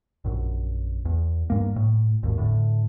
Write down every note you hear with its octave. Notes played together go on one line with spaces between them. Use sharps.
A#1 F#2
E2
G2 A#3
A2
G#1 D#2
A2 D3